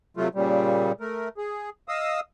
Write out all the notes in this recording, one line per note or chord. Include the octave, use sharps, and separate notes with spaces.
C3 F#3 A3 F4
A#2 C#3 G3
A3 A#4
G#4
D#5 F5 D#6 E6